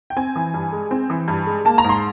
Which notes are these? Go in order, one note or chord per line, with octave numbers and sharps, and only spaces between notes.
G5
C4 G#5
E3
G2
G#3
C4
E3
G2
G#3
A#3 A5
A#5
G#2 C6